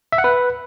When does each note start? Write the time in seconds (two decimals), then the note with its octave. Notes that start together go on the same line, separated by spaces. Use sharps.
0.12 E5
0.18 F#5
0.24 B4